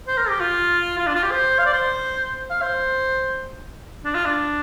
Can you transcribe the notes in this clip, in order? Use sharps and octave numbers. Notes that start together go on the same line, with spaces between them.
C5
A#4
G4
F4
F4
D4
F4
G4
C5
F5
D5
C5
F5
C5
D4
F4
D4